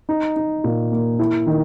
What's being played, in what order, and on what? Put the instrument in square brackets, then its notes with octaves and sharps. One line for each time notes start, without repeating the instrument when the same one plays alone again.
[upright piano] D#4
D#4
A#2
A#3
E4
D#3